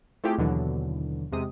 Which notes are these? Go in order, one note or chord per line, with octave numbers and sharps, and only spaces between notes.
A3 C4 E4 F4 G4 G#4
D#2 B2 D3 E3 F#3
E2 C3 G#3 D#6